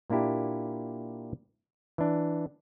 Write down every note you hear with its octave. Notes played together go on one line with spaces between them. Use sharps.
A#2 A#3 D4 E4 G4
E3 D4